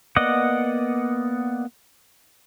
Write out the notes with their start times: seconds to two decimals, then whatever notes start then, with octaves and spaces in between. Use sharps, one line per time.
0.16 A#3 B3 D5 D#5 F#5